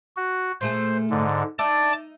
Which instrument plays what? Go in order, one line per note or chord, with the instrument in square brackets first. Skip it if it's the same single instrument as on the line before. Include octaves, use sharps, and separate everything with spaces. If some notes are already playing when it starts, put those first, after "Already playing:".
[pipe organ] F#4
[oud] A#2 A3 G#4 [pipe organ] C5
[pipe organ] G#2 D3
[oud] D#4 E5 [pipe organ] D5 A5 D6